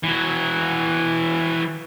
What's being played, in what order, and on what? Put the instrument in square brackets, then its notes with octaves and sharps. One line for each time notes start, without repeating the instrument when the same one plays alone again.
[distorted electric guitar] E3 F#4